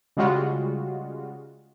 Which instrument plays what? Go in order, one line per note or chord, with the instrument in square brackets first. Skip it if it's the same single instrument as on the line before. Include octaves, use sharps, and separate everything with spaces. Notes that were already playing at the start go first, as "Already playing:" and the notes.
[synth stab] C#3 G3 G#3 F4 F#4